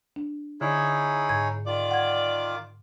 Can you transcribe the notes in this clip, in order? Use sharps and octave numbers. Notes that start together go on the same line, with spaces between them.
D4
D3 D#4 E4 G#4 C#5
G#2 G#6
D#3 F4 D5 D6
F#5 G#6